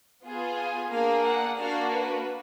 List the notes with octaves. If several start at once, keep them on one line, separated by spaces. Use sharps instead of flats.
B3 F4 G#4
G#5
A#3 D4 G#4 F5
F#5
A#3 D4 F#4 F5
B4